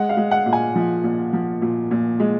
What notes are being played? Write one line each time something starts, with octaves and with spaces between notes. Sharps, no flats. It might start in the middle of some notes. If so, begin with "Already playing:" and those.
Already playing: G#3 F#5
F5
G#3
F#5
A#2
G#5
F3
A#2
F3
A#2
A#2
G#3